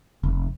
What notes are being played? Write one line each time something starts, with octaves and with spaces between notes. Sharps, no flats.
F1